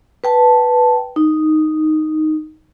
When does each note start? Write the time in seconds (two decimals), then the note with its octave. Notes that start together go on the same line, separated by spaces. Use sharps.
0.24 B4 G5 A5
1.16 D#4